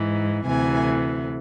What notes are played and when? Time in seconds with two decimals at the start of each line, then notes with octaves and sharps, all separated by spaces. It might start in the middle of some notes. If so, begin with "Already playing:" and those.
Already playing: G#2 E3
0.46 D2 C3 E3 G#5